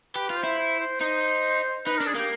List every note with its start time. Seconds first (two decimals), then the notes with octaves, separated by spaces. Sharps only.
0.15 G4 B4
0.30 F4
0.37 C5
0.44 E4
0.58 C5
0.79 C5
1.01 D#4 C5
1.86 D#4 B4
1.97 D4 A#4
2.07 G#4
2.15 A#3 G4